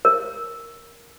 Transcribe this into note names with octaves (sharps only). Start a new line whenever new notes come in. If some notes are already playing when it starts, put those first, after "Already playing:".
A#4